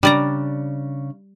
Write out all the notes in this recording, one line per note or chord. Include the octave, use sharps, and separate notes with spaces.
C#3 G3 D4 D5 A#5